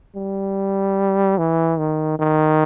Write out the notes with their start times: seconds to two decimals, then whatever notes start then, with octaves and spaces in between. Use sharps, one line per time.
0.16 G3
1.38 E3
1.79 D#3
2.19 D#3